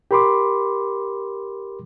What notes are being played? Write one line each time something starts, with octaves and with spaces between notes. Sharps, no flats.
G4 A#4 B5 C6 D6